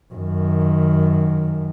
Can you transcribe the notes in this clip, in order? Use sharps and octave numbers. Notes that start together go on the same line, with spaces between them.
F#2 D#3